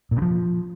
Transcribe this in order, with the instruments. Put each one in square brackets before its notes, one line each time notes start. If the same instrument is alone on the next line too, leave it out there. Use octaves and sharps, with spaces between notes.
[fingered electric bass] A#2
C#3
F3